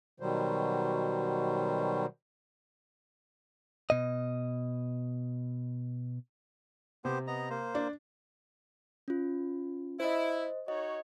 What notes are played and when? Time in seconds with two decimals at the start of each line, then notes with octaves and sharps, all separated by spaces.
0.20 B2 D#3 F#3 G3 C5
3.90 B2 D#5
7.05 C3 B3 G4 C5
7.27 B3 D#5 A#5
7.50 A#3 C5
7.75 D4
9.08 C#4 F4
10.00 E4 C5 D#5
10.68 D#4 F#4 C#5 D#5